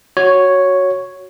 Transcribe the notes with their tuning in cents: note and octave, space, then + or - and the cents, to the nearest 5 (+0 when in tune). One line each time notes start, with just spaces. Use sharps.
F#4 +0 C#5 +0